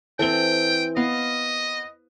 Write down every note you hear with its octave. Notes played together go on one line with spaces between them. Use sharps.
E3 C4 A4 G5 G7
B3 D#5 F5